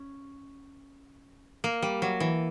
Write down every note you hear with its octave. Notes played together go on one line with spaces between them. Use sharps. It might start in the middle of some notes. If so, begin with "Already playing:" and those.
Already playing: C#4
A#3
G3
F#3
E3